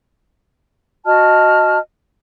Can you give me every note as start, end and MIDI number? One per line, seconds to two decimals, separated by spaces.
1.05 1.78 66
1.05 1.78 75
1.05 1.78 81
1.05 1.78 89